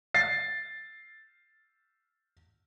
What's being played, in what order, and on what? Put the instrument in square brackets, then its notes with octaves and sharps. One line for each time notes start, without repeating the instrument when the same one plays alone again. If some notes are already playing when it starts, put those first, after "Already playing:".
[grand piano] A6 C7